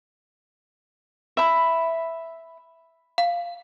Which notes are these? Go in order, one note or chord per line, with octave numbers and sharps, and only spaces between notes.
E5 B5
F5